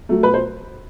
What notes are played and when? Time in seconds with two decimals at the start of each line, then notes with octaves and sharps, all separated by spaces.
0.09 F#3 A3
0.23 B2 B4
0.34 C5